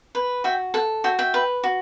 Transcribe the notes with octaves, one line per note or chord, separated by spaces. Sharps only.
B4
F#4 E5 G5
A4 F#5
F#4 E5 G5
E5 G5
B4
F#4